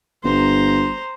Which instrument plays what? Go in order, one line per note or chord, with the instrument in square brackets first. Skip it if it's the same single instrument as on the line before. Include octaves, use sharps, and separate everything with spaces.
[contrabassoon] G1 [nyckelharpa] C5 A#5